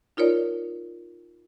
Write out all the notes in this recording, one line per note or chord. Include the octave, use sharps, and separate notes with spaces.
D#4 F4 A#4 C#5 D5